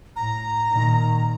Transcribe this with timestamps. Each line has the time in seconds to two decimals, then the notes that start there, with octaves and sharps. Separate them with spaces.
0.16 A2 A#5
0.70 A#2 D#3